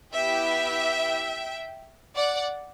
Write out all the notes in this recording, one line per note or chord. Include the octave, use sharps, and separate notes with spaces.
B3 E4 G4 E5 G5
D5 F#5